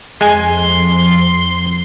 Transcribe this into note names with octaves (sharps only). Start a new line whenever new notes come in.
F2 G#3 G#5 C6